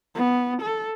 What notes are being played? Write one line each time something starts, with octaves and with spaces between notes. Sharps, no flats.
B3
A4